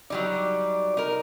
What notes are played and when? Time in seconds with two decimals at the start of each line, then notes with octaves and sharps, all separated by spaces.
0.10 F#3 G3 D#4 D5
0.97 D#4 A#4